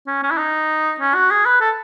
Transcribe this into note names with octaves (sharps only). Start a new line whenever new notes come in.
C#4
C#4
E4
D#4
C#4
F#4
G#4
B4
A4